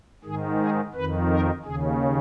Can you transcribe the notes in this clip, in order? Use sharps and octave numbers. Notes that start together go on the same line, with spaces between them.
G#2 D#3 G#4
G#4
F2 D#3 B4
A#4
D#2 C#3 G#4